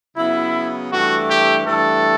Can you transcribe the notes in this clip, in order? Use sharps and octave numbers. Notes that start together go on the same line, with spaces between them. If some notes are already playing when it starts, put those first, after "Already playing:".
C#3 F#3 B3 E4
G2 E3 A3 F#4
G4
G2 E3 A3 A4